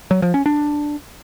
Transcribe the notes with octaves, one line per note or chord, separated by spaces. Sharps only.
F#3
F3
C#4
D4